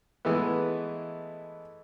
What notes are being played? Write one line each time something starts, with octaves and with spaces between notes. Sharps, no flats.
E3 G#3 A3 B3